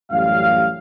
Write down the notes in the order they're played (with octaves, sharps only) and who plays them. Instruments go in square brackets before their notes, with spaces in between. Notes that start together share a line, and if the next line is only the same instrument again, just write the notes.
[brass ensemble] A1 F#2 G3 F5